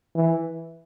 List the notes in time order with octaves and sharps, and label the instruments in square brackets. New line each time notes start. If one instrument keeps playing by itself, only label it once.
[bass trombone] E3